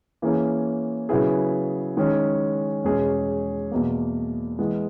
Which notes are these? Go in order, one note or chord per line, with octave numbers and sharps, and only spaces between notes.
E3 A#3 C#4 G#4
C#3 F#3 B3 E4 G#4
D#3 G#3 C#4 G#4
E2 B2 G#3 C#4 G#4
E2 B2 A#3
E3 G#3 B3